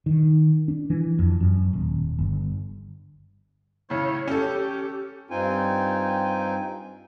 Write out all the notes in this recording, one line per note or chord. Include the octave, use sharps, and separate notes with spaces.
D#3
D4
E3
F2
F#2
D#1
G1
A2 C#3 C#5
C#4 G4 A4
G2 C4 D#4 F4 G5 G#5